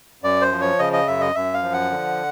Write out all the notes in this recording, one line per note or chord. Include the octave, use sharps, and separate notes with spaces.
F#2 D5
C5
F3
C#5
C#3 D#5
D#5
F#2 E5
D#5
F#2 E5
F5
F3
F#5
D3